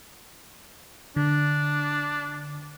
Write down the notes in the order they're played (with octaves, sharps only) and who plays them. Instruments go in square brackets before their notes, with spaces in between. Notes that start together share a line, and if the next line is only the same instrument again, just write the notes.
[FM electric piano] D3 [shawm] D4